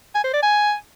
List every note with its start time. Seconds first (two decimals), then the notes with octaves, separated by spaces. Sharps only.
0.14 G#5
0.24 C5
0.33 D5
0.43 G#5